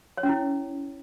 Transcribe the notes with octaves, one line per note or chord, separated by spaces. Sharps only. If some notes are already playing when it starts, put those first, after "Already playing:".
C#5
C#4
E4